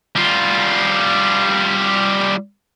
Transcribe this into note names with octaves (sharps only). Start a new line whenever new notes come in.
G3 F4